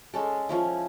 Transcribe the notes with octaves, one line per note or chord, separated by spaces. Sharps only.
G#3 C#4 A4
F3 C#4 E4